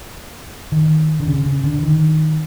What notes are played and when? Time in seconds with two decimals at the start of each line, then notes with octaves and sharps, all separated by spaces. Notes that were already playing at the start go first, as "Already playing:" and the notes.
0.72 D#3
1.20 D3
1.27 C#3
1.45 C#3
1.64 D3
1.83 D#3